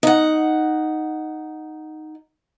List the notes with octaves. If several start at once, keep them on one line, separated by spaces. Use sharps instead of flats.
D#4 F#5